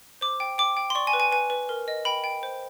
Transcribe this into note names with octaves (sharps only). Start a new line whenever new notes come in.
C5 D6
G5
G5 D6
G5
C6
D5 C#6
G#5
B4
G#5
B4 G#5
B4
A#4
D#5
G5 B5
G5
C5